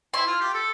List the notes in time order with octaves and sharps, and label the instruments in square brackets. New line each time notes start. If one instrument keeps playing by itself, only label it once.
[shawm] E4 [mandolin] C6
[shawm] F4
G4
A4